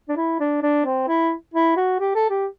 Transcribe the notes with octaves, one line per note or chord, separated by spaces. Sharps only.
D4
E4
D4
D4
C4
E4
E4
F#4
G4
A4
G4